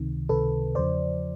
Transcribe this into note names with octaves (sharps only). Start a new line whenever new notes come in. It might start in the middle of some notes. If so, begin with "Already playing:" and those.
Already playing: C#2 C3 D#3
C#2 C3 D#3 A4 B4
E2 C#3 F3 C5 D5